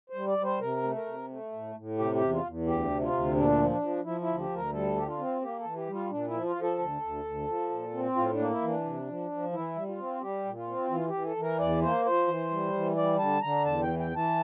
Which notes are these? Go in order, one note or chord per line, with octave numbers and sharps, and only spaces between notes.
C5
G3
D5
G3
C5
C3 A#4
A3
A#4
C3
A3
A2
A2
C3 G4
G4
E2
F4
E2
D2 G4
C3
F4
D2
A#2 D4
F3
D4
F3
F3 E4
E4
D2
G4
D2
A#4
G3 A4
D3 G4
F4
C4
A#3 G4
A4
E3
G4
G3
F4
A#2 D4
E4
F3
F4
F3
A4
D2
D2
D2
F3
A#2
C4
A2 F4
D4
A#3
E4
E3
D4
C3
F3
F3
E3 E4
G3
F4
C4
G3 G4
A#2
F4
C4
E3 F4
G4
E3
A4
E3
A#4
E2 D5
A#3 C5
F3 C5
E3
G3
E3
G3 D5
D3 A5
D3 A#5
E2 A5
G5
E3
G5
E3
A5